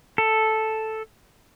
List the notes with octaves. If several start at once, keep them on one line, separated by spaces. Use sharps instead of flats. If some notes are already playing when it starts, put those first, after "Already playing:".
A4